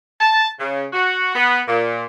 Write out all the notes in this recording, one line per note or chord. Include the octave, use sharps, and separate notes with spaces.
A5
C#3
F#4
B3
A#2